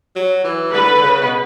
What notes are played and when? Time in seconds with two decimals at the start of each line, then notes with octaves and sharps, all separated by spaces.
0.16 F#3
0.44 E3
0.73 D3 B4
0.95 D3
1.03 C#3
1.21 B2